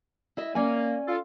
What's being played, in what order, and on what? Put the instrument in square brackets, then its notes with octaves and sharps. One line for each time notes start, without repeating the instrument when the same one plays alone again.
[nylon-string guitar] E4 D#5 E5
[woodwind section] A#3 [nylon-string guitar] C#4 D5 G#5
[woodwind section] F4 A4